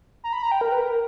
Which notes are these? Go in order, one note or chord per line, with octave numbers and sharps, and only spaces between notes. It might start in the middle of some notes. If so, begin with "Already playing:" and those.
A#5
B5
A#5
G5
A#4
B4
A#4